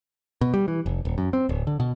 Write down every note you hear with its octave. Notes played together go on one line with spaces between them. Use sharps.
B2
G3
E3
F1
D#1
F#2
C4
D1
D3
B2